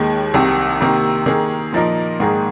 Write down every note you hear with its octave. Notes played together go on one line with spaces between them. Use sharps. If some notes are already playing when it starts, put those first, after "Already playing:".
Already playing: D#2 D#3 G#3
C2 C3 D#3
C3 D#3 A#3
D#3 A#3 G#4
A#2 F3 A#3 D#4 A#4
G#2 D#3 A#3 G#4